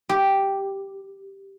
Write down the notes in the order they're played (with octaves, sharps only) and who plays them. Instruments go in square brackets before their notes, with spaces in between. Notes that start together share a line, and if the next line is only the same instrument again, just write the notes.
[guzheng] G4